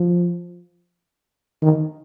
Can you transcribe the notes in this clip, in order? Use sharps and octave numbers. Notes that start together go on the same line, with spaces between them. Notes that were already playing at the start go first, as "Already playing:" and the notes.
Already playing: F3
D#3